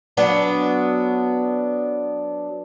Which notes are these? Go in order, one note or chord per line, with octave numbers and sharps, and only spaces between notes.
F#3 B3 D4